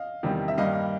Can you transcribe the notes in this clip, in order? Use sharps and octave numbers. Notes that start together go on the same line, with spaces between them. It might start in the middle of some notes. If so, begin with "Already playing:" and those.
Already playing: D#5 F5
E2 C3 D#3 G3
E5
G2 D#3 G3 A#3 D#5 F5